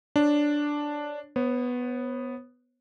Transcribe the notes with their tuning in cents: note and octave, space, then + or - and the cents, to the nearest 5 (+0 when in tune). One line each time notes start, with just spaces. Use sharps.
D4 +0 C#5 -5
B3 +0 C#5 -45